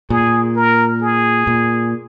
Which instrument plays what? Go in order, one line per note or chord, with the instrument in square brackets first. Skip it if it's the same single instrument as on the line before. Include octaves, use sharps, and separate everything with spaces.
[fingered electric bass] A#2 [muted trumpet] G#4
[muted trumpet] A#4
G#4
[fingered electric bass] A#2